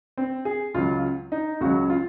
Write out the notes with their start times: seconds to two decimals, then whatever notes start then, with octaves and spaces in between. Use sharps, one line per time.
0.18 C4
0.45 G#4
0.74 C#2 C#3 F#3 F4
1.32 D#4
1.61 C#2 C#3 F#3 F#4
1.90 F4